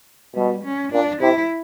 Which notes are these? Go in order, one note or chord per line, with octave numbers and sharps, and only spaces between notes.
B2 G3
C#4
A#2 D4
C3 E4